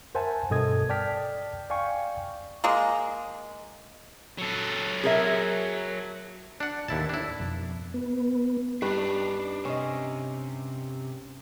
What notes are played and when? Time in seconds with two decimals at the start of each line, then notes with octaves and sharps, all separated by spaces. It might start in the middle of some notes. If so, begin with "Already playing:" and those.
0.15 A#4 C5 E5 F#5 G#5 A5
0.50 G2 B2 A4 D#5 D#6 G#6
0.89 D5 G5 A5 F6 B6
1.70 D5 F5 G5 G#5 C#6
2.64 G#3 A#3
4.38 F#3 A4
5.04 G#4 A#4 E5
6.60 D4 F#5
6.88 D#2 A2 E4 A5
7.09 D4 E4
7.40 F2 B2 F3
7.94 B3
8.82 G2 D4 D#4 B4
9.65 C3 C#4 D#5